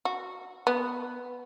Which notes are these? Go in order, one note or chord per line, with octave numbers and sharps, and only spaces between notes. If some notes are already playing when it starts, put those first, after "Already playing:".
F#4
B3